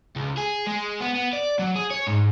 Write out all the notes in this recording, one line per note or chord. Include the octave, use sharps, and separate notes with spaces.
C#2
G#4
G#3
B3
B3
D5
F#3
G#4
C#5
G#2